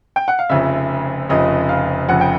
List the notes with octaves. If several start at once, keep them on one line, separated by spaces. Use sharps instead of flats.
G5
F#5
F5
F1 F2 C#3 E5
F1 F2 C#3 D#5
F5
F1 F2 C#3 F#5
G5